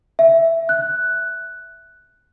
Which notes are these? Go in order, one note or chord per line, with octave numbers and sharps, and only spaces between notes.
E5
F#6